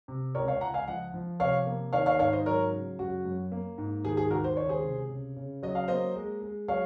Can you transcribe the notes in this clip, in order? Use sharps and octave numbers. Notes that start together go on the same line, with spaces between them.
C3
C#2 A#4 C#5
C#5 F5
C#2 F#5 A#5
F5 G#5
F3 D#5 F#5
F3
C3 C#5 F5
A#3
D#3 C#5 F5
C#5 F5
G#2 C#5 F5
C5 D#5
F#3 A#4 C#5
C#3
F#2 F#4
F#2
A#3
G#2
D#3 G#4
G#4
D#2 F#4 A#4
C5
C#2 C#5
G#4 C5
C3
C#3
C#3
F#3 D#5
F5
A#3 C5 D#5
G#3
G#3
F#3 C#5 F5